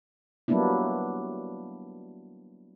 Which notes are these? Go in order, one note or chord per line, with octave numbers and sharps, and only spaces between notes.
F#3 G3 A#3 B3 D4 E4